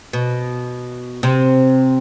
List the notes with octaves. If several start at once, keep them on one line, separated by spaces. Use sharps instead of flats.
B2
C3